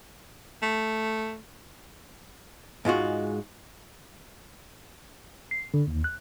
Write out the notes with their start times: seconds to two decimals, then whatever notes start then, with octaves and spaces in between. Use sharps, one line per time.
0.62 A3
2.85 G#2 G#3 F4 F#4
5.51 C7
5.74 D3
5.87 D#2
6.04 F#6